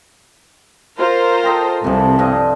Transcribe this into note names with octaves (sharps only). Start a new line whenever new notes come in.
F4 A#4 C5
A4 D#5 G5
C2 C3 E3 F3
G2 F3 D#5